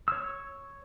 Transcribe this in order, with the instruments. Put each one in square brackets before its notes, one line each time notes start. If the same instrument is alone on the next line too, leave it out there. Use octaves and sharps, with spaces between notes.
[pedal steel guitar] C#5 E6